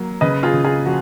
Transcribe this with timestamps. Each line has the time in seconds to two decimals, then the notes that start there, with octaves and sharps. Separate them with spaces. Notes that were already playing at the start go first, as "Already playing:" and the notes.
Already playing: F#3 A#3
0.21 C#3 B4 D#5
0.43 F4 G#4
0.53 C#3
0.64 F4 G#4
0.86 F3 F#4